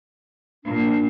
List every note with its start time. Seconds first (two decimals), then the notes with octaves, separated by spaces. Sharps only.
0.64 A#2 D4